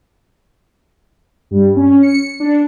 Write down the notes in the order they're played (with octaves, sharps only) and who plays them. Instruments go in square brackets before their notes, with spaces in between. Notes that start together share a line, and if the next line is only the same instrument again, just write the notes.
[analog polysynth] G2
C#4
C#7
D4